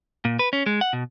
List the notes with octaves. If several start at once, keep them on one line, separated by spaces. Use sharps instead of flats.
A#2
B4
C#4
G#3
F#5
B2